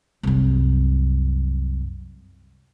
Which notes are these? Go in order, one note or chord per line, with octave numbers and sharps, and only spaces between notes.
C2 F#2